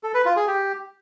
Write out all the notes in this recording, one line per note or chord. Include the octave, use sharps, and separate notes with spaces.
A4
B4
F4
G#4
G4